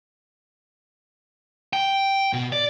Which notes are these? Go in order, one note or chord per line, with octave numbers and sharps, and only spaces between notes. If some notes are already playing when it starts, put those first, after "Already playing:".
G5
B2
D5